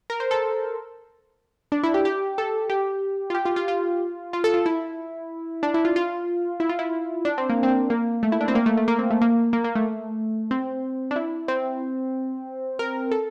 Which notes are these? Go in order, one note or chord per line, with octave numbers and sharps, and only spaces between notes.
A#4
C5
A4
D4
E4
G4
G4
A4
G4
F4
G4
F4
F4
F4
F4
A4
F4
E4
D4
E4
F4
F4
E4
F4
E4
D4
C4
A#3
C4
A#3
A3
E4
D4
C4
A#3
A3
A3
A#3
C4
A3
A#3
A#3
A#3
A3
C4
D4
E4
C4
A#4
A4